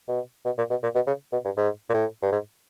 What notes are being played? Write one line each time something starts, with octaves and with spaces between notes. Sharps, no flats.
B2
B2
A#2
B2
A#2
B2
C#3
B2
G2
G#2
A#2
A2
G2
G#2